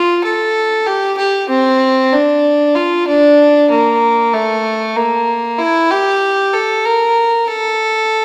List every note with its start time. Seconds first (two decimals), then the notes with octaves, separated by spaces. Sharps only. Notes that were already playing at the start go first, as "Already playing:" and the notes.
Already playing: F4
0.24 A4
0.87 G4
1.18 G4
1.50 C4
2.13 D4
2.76 F4
3.07 D4
3.70 A#3
4.33 A3
4.97 A#3
5.59 E4
5.91 G4
6.54 A4
6.85 A#4
7.48 A4